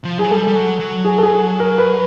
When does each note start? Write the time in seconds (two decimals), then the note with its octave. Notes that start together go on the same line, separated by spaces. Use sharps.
0.05 F3
0.18 F#3 G#4
0.31 G3 A4
0.48 G3
0.55 F#3
0.79 F#3
1.05 G#4
1.18 A4
1.23 G#4
1.60 A#4
1.78 B4